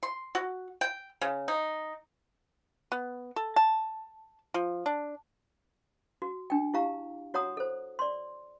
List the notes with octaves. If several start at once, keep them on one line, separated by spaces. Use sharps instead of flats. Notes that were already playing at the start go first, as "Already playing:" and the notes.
C6
F#4
G5
C#3
D#4
B3
A4
A5
F3
D4
F#4
D4 G5
E4 G4 F5 A#5
F#4 C#5 F#5 A#5 D#6
A4 C5
D5 C6